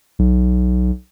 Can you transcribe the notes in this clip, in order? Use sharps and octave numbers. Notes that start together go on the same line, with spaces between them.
B1